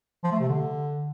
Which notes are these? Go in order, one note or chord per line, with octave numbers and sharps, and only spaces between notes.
F3
A3
C3
D3